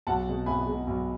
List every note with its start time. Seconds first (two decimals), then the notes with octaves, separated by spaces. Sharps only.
0.07 B1 F#5 A5
0.27 B2 G#3
0.46 B1 G#5 B5
0.66 B2 G#3
0.87 B1